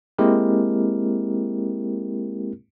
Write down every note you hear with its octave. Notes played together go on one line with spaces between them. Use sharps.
G#3 A#3 C4 E4 G4 A#4